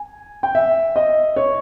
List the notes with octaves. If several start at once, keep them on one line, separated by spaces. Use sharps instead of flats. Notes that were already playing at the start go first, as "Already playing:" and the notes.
Already playing: G#5
G5
E5
D#5
C#5